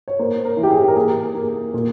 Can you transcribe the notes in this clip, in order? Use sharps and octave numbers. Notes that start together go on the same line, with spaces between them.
C#5
A#3 C5
A#4
E3
G4
G#4
A#4
A#3 G#4
A#3
A#2